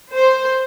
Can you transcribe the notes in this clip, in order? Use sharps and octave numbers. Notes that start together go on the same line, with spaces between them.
C5